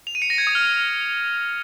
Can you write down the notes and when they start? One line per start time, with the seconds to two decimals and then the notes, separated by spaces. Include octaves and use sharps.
0.07 F7
0.15 D#7
0.22 C#7
0.30 A#6
0.38 G#6
0.47 D#6
0.55 F6